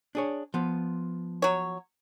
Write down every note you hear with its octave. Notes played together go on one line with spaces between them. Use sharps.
D4 G#4 C#5
F3 B3
F#3 C#5